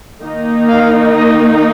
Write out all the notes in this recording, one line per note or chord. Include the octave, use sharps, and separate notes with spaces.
D#3 A#3 D#4
F5
D#5